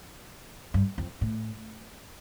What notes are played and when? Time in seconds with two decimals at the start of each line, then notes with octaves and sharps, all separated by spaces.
0.74 G2
0.98 F2
1.21 A2